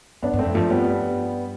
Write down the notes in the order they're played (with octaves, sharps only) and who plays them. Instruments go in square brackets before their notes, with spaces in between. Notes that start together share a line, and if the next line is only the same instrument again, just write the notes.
[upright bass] G2 [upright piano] B3 D4
[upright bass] G2
[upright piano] A3 C4
[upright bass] F2
[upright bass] G2 [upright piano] F3 A3
[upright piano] G3 B3